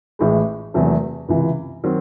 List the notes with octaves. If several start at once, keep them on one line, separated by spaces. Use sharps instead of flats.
A1 A2 G#3
E1 E2 C3 F#3 A3
C#2 C3 E3
D#3 F#3 C4